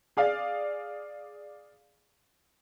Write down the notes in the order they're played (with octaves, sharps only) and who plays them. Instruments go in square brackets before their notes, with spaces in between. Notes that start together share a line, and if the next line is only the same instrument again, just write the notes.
[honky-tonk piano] G#4 D5 F5